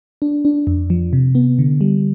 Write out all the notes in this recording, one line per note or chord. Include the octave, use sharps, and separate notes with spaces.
D4
D4
F2
F3
C3
B3
D3
G3